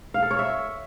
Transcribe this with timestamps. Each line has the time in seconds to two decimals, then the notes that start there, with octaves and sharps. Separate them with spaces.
0.14 F5
0.22 A4
0.31 C#5
0.39 E5